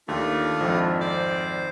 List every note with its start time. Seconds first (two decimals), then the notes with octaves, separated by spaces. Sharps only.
0.08 D#2 A3 D4 F4
0.60 G#1 F2
1.01 C5 D5